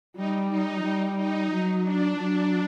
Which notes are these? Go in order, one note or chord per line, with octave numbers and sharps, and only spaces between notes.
G3 D#4
D#4
G3 D#4
D#4
F#3 D#4
D4
F#3